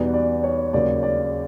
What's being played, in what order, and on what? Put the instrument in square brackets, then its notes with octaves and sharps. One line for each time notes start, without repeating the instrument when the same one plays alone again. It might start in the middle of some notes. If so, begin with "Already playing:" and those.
Already playing: [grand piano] E2 B2 G3 B3 D#4 [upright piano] D5
[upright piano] D5
C#5
[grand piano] D#2 C#3 F#3 [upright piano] D5
[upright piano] D5